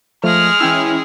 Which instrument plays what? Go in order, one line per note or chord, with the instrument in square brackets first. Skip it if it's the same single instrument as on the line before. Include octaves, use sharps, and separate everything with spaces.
[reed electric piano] F3 A3 [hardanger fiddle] G#3 G#4 [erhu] F6
[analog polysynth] E3 C#4 E4 [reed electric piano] G5 G#5 E6